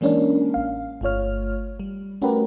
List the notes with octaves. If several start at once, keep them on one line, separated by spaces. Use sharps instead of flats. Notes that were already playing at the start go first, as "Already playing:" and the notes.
E3 G#3 A#3 C#4 D4 A#4
A1 F5
G1 A3 F4 C#5 F6
G3
A3 C#4 F#4 G4 A#4 B4